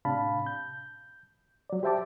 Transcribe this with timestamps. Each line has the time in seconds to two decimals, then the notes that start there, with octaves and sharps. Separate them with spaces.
0.05 A2 C3 D4 F5 A5 B5
0.46 G6
1.70 F#3 D5
1.83 G4 C5 E5 G5 A5 D6